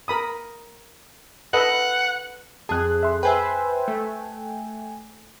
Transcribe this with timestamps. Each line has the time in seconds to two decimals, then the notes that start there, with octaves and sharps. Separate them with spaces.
0.08 A#4 B5 D#6
1.53 A4 B4 D#5 F#5
2.69 F2 G#4 A5 F#6
3.03 E5 C6
3.23 B4 C5 E5 G5 G#5
3.88 A3